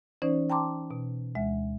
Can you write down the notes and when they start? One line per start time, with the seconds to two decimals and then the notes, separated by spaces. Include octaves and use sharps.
0.22 E3 C#4 D#4 C5 D5
0.50 G5 A5 A#5 C6 D6
0.91 B2
1.35 D2 G#3 E5